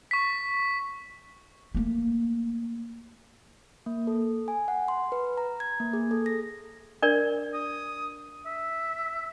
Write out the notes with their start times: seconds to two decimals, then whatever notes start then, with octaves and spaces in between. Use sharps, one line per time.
0.11 C#6 B6
1.75 A3 A#3
3.86 A#3
4.07 A4
4.48 G#5
4.68 F#5
4.88 C6
5.12 B4
5.38 A#5
5.60 G#6
5.80 A#3
5.93 G#4
6.11 A4
6.26 A#6
7.02 D4 A#4 D5
7.54 D#6
8.46 E5